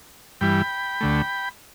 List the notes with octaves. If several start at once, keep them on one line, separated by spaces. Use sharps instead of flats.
G2 E3 G3 G5 B5
D2 D3 A3